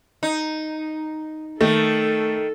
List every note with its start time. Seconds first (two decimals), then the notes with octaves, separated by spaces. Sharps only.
0.23 D#4
1.61 D#3 A3 A4